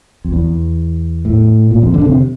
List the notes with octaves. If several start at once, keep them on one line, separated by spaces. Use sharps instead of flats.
F2
E2
A2
A#2
F2
D3
C3